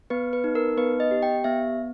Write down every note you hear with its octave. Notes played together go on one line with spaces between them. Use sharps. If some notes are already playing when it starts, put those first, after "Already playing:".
B3 B4
B4
D#4
A#4
B3 B4
D#5
G4
G5
B3 E5